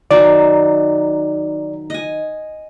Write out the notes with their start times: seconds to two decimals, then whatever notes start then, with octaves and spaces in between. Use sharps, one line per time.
0.11 D#3 F#3 D#4 D5
1.90 D#5 G#5